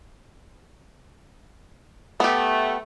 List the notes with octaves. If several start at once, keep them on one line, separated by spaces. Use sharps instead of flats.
A3 B3 G4